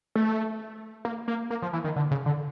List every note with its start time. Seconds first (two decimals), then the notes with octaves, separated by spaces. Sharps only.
0.15 A3
1.05 A#3
1.28 A#3
1.50 A#3
1.62 F3
1.73 E3
1.84 D#3
1.96 D3
2.11 C#3
2.26 D3